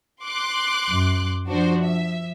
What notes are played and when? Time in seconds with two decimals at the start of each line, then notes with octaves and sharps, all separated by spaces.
0.23 C6 D6 F#6
0.89 F#2
1.47 F3 D4 F#4 C5
1.83 E5